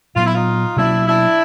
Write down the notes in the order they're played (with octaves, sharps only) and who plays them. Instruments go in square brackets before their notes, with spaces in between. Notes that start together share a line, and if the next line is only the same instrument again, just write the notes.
[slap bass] A#2 F#3 B3 [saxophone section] F4
[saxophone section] E4
D#4 F4
[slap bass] B2 F#3 A#3 C#4 [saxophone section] D4 E4
[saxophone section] D4 E4